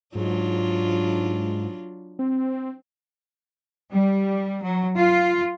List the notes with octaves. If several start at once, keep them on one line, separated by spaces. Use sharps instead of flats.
G#2 F#3 D4 F4
C4
G3
F#3
F4